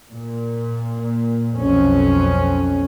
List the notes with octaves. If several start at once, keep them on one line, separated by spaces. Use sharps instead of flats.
A#2
B1 F2 C#4